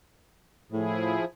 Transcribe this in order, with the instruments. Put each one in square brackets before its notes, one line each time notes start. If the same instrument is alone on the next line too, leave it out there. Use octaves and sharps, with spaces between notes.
[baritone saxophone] A2 [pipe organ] F3 E4 G#4